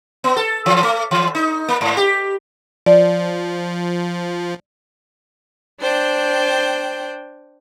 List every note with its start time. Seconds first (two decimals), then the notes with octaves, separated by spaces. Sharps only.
0.24 B3
0.36 A4
0.66 E3
0.83 A3
1.11 E3
1.35 D#4
1.68 A#3
1.81 G#2
1.97 G4
2.86 F3 D5
5.81 D4 C5 G5